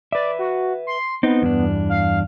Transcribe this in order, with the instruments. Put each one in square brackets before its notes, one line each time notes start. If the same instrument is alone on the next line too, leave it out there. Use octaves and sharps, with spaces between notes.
[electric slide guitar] B4 E5 [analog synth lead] D5
[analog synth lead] F#4
C6
[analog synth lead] B3 [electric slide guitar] C4 D#4
[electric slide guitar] E2 G2 D4
[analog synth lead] F5